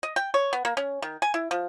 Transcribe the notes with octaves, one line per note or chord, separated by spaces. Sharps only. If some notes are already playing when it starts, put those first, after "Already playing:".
D#5
G5
C#5
B3
A#3
C#4
D#3
G#5
E4
F3